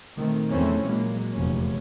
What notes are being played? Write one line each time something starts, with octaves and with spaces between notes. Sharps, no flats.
A#2 D#3 A3 C4
E2 E3 F3 A3 C4 C#4
A#2 F#3 G#3 A#3
F1 E2 C3 C#4